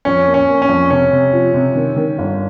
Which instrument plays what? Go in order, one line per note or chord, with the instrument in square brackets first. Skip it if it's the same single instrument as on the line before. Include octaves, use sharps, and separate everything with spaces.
[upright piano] F2 [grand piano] C#4
[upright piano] A#3
[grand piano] C#4
[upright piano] A#3
[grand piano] C#4
[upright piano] F2
[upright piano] C3 [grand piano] C#4
[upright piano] C3
F3
C3
D#3
D#3
G1